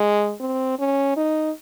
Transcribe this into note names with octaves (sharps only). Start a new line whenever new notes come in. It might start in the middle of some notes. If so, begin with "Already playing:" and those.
Already playing: G#3
C4
C#4
D#4